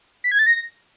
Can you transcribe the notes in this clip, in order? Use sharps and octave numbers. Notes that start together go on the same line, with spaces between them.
B6
G#6
A6
A#6